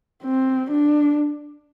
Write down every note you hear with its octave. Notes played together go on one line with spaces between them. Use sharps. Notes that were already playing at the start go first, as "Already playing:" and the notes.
C4
D4